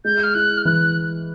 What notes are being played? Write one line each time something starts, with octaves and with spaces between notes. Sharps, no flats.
G#3 G6
F6
E4 F#6
F6
E3 F#6